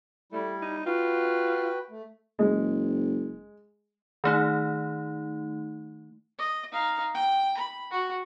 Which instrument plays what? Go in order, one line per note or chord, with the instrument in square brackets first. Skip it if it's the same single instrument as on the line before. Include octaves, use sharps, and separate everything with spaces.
[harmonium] G3 E4 [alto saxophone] A3
[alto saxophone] D#4
[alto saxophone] F4 [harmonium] F#4 B4 G5
[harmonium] A3
[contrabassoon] F#1 [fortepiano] G#3
[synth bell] D#3 A3 D#4
[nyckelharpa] D#5
D#4 F5
G5
B5
F#4